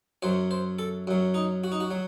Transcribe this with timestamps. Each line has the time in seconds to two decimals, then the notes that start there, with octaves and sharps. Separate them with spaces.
0.23 F#2 F#3 C5
0.51 C5
0.79 A4
1.07 F#2 F#3
1.34 D#4
1.64 F#4
1.72 D#4
1.80 F#4
1.91 F#3